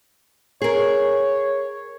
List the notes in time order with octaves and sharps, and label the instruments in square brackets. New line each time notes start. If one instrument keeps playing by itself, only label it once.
[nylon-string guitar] G#4 A#4 [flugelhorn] C#5